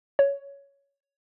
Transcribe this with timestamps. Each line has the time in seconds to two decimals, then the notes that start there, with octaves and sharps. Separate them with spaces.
0.19 C#5